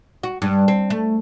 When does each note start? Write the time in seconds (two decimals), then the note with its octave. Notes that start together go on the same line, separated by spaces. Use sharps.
0.23 F#4
0.42 G2
0.68 C4
0.90 A3